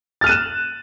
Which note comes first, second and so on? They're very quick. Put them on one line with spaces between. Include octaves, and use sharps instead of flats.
A6 F6 D#7 F#6 E7